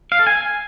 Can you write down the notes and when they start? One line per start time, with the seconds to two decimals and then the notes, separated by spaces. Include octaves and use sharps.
0.12 F5
0.19 A4
0.27 G#5